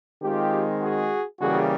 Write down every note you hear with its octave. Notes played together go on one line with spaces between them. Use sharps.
D#3 G#3 C4 F4 G4
F#4 G#4
C#3 E3 G3 A#3 F#4 G#4